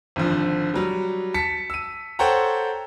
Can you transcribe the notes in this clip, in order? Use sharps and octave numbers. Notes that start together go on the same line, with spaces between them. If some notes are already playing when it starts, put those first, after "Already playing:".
G#1 D3 F3
F#3 G3
A5 B6 C#7
E6 D#7
A4 C5 C#5 F#5 G5 A#5